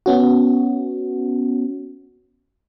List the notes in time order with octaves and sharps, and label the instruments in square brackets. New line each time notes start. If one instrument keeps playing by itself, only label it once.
[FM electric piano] B3 C#4 F#4